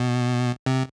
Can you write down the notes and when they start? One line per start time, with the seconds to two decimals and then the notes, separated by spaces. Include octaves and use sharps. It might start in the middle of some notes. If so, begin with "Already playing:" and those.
Already playing: B2
0.66 C3